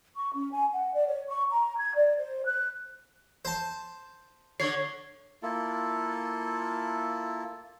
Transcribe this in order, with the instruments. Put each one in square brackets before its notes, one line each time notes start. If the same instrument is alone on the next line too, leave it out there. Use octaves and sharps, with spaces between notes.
[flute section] C#6
C#4
G#5
F#5
D5
C#5
C#6
A#5
G#6
D5
C5
F#6
[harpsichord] C5 A5
[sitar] D3 C#5 [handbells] C#6 G#6 C7
[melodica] A#3 E4 F4 A4